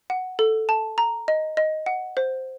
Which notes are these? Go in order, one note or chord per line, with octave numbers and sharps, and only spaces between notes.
F#5
A4
A5
A#5
D#5
D#5
F#5
C5